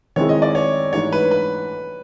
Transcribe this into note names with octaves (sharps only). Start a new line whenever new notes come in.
D#3 G#3 C4 E4 G#4 C#5
D#5
D5
C#5
G#2 E3 A3 D4 G4 C#5
B4
B4